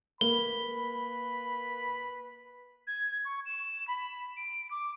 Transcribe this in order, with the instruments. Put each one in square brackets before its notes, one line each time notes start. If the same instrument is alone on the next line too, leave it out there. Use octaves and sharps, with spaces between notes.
[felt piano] A#3 [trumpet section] B4 B5 [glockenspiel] G7
[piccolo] G#6
C#6
E7
B5
D7
D6